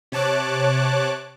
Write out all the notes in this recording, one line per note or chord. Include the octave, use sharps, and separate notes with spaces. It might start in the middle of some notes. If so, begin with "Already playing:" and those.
C3 C#5 A5 D6 F#6